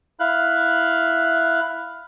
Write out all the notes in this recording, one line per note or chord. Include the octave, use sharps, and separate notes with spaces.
E4 F5 F#6